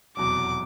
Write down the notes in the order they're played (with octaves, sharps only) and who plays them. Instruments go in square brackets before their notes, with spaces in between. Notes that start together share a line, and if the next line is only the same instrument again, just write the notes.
[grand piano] F1 E2 B2 F#3 [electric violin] D6